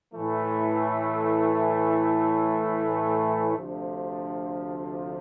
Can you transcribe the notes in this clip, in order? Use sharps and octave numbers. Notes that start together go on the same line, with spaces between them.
A2 E3 A3
D2 C3 F3